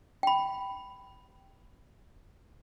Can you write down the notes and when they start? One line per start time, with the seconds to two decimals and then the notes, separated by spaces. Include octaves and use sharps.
0.23 G5 B5